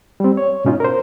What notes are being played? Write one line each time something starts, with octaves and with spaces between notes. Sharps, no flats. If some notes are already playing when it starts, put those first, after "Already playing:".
G3 C4
C#5
G#2 B2 C#4 D#4 F4
A#4 C5